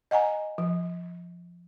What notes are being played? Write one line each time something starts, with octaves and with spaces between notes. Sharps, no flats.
D#5 F#5 G#5 A#5
F3